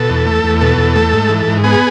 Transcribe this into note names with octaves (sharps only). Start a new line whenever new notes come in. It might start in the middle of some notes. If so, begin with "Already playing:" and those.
Already playing: B2 A4
E2
A3
E2
B2 A4
E2
A3
G#2
E3
G#2
B3 G#4